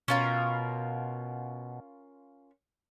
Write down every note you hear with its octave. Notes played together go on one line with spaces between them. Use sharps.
B2 C#4 F4 A#4